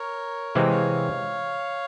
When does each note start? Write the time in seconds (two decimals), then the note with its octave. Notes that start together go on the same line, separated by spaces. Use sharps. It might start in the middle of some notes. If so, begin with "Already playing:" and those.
Already playing: A#4 C#5
0.55 C3 E3 G#3 C4 F5
0.62 G5
0.69 C#5 F5